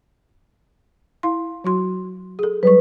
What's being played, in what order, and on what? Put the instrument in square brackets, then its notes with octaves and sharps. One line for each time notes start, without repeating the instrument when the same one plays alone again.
[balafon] E4 F5 C6
F#3 F#4 C6
G#4 A4
[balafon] F#3 G3 C#6 [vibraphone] B4